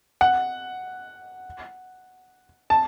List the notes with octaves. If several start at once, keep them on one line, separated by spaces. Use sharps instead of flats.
F#5
A5